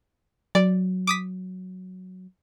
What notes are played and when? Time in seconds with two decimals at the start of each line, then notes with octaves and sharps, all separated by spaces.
0.55 F#3 D5
1.07 D6 D#6 B6